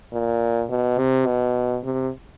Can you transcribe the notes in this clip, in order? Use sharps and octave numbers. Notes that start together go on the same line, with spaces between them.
A#2
B2
C3
B2
C3